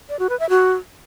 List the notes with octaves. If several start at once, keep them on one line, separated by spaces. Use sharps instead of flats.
D5
F#4
B4
E5
F#4